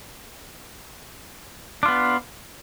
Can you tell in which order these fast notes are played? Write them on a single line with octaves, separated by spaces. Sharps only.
D4 F4 B3